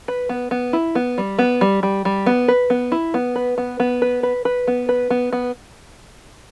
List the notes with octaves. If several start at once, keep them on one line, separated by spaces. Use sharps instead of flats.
B4
B3
B3
E4
B3
G3
B3
G3
G3
G3
B3
B4
B3
E4
B3
B4
B3
B3
B4
B4
B4
B3
B4
B3
B3